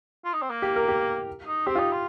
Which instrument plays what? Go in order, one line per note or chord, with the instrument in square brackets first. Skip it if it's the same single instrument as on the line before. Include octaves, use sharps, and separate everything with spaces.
[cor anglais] F4
D#4
C4
A#3
[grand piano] G4
A#4
G4
[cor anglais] D#4
[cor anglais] C4 [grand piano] G4
[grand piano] F4
[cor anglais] D#4
F4